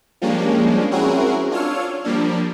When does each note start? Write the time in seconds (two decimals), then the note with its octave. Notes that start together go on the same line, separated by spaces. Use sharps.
0.22 F3 G3 G#3 A#3 C#4 D4
0.91 C4 C#4 E4 F#4 G#4 A#4
1.51 D4 F4 C#5 E6 F6
2.05 F3 G3 A#3 D4